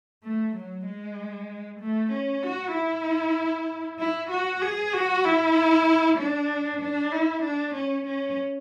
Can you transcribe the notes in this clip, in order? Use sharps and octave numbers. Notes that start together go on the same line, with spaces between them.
A3
F#3
G#3
A3
C#4
F#4
E4
E4
F#4
G#4
F#4
E4
D4
D4
E4
D4
C#4
C#4